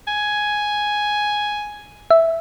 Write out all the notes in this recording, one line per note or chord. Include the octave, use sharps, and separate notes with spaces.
G#5
E5